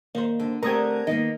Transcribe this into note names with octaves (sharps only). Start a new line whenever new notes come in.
D#3 A#3 C5
D3
D3 A3 C4 G4 A#4 A#5 D#6 G#6
D#3 A#3 B3 D#4 D#5